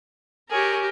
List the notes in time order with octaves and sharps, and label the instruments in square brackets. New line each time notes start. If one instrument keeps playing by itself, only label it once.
[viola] G4 A#4 [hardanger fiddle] G#4 C#5